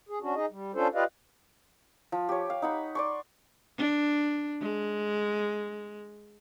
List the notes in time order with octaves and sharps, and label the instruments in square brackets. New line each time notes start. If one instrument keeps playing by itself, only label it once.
[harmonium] G#4
C#4 D4 F#4
D#4 G#4 D#5
G3
C#4 D4 F4 A4 C5
F4 G4 B4 D5 D#5 F5
[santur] F3
G4 C#5
F5
D#4 F#5 B5
D5 C6 C#6
[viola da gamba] D4
G#3